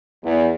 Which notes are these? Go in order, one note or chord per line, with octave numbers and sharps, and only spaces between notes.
E2